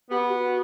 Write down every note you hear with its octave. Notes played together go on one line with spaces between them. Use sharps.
B3 G4
F#4